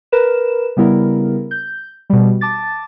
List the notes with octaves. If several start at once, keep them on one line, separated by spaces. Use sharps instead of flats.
A#4 B4 E7
C#3 G3 B3 E4 A#4
G6
B2 G3
A5 D6 A6